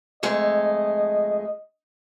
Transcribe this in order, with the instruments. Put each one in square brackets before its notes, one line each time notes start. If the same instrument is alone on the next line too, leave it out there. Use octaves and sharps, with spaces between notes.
[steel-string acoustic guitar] F2 G#3 A3 [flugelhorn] D#5